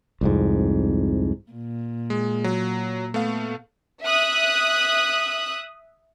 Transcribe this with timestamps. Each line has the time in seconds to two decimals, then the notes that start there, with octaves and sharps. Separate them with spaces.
0.21 C2 F2 G#2
1.52 A#2
2.10 G#3
2.44 F#3
3.14 A3 B3 F5
4.04 E5 D#6 F#6